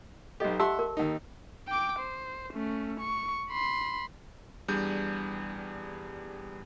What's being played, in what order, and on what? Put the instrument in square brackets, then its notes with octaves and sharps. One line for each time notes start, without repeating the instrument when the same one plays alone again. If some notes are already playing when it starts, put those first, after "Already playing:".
[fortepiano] B1 G4 [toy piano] A4 D#5
[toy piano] G4 A5 E6 [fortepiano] E5 F#5 C6
[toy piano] A#4
[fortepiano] D#2 D#4
[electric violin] G5 D6
C5
A3 C#4
C#6
B5 C6
[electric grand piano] E2 G3 D4 G#4 G6